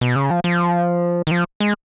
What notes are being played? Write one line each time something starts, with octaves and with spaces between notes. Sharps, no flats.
B2
C#3
F3
F3
D#3
F3
G#3